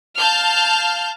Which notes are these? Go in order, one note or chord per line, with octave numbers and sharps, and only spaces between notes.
F5 A5 F6 G6